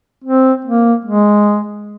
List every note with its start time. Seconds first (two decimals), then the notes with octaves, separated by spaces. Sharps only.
0.24 C4
0.65 A#3
1.05 G#3